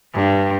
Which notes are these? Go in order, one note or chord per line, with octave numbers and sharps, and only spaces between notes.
G2